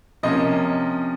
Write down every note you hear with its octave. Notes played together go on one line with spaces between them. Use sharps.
C3 F3 A#3 C#4 D#5